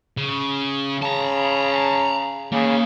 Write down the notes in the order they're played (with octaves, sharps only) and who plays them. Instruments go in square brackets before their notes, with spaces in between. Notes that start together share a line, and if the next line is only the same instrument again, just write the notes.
[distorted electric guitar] C#3
[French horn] C#3 [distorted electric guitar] A5 A#5
[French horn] C#3 [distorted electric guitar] A#3 D#4